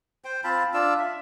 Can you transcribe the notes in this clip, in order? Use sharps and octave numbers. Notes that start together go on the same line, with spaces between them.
C5 G5
C4 F4 A5 B5
D4 F4 E6
E5